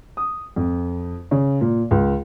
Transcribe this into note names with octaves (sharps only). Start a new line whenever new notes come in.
D#6
F2
C#3
A#2
C#2